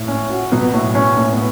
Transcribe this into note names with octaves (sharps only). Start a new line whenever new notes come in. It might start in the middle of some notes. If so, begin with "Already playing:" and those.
Already playing: A2
C#4
F#4
B2 F#3 B3
A2
C#4
A2
B3